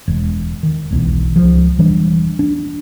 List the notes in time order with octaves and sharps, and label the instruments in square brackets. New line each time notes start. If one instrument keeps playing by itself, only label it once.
[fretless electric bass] E1
D#3
E1 B1 E2
C#2 F3
E1 E3 G3 D4
D4